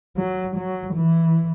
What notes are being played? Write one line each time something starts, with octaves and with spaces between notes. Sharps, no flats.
F#3
F#3
E3